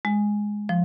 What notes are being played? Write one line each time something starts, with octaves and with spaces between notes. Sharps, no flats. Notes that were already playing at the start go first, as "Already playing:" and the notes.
G#3
F3